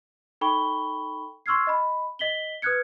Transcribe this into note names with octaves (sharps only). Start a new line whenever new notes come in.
D#4 A4 G5 B5 C#6 G7
C6 C#6 E6 F6 G#6 C7
D#5 B5
D#5 B6 F#7 G7
B4 D#6 F6 F#6 G#6 C#7